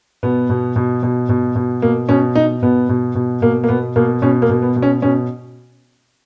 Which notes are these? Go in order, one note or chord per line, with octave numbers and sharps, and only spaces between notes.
B2 B3
B2
B2
B2
B2
B2
B2 A#3
B2 C#4
B2 D#4
B2 B3
B2
B2
B2 A#3
A#3
B2 B3
B2 A#3
B2 C#4
A#3
B2
B3
B2
C#4
B2 C#4